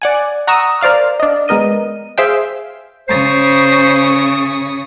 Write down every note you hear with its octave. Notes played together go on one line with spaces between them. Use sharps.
D5 F#5 G#5
F#5 A#5 C#6 D#6 E6
A#4 C5 D5 F5 F6
D4 D#5
G#3 B3 A#4 D#5 D#7
G#4 C5 E5 F5 G5
C#3 C5 C#5 D#6